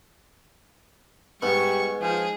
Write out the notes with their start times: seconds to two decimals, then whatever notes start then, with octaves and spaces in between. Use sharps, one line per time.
1.42 G#2 G3 B3 C#6
2.01 F3 G#4